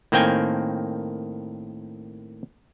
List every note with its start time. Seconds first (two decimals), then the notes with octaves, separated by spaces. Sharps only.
0.12 A2 D#3 A#3 C4 G5 G#5